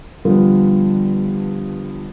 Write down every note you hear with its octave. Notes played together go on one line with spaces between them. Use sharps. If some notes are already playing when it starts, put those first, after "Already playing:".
G2 D3 F3 G3 B3 F4